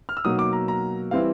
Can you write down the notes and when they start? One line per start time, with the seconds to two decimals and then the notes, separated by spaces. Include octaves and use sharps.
0.09 F6
0.17 E6
0.25 B2 F#3 A#3 D#4 D#6
0.39 D6
0.53 A#5
0.68 A#5
1.11 E3 G3 C4 E4 F5